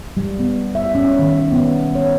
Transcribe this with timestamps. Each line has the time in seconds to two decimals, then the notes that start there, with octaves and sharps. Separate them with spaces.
0.17 G3
0.40 B3
0.75 E5
0.95 C#4
1.19 D#3
1.52 B3
1.95 C#5